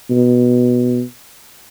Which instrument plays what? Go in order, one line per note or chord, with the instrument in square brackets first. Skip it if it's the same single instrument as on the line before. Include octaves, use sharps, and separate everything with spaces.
[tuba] B2